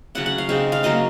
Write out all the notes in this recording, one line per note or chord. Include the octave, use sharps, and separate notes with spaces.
C#3 F#3 C#4 F#5
F#5
F5
C#3 G#3 C4 D#4
F5
F#3 A#3 C#4 D#5